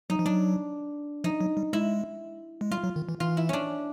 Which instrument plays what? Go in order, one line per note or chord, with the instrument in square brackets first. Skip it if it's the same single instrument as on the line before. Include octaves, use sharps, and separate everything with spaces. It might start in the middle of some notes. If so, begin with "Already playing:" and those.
[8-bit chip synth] F#3 [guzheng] D#4
[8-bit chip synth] F3
[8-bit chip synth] F#3 [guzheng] D4
[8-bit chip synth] F3 [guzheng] D#4
[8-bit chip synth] F#3
G3
[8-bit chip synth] G#3 [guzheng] E4
[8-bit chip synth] G#3
[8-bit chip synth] G3 [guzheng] F4
[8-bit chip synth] F#3
D#3
E3
[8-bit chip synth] E3 [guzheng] F4
[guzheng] E4
C#4 D4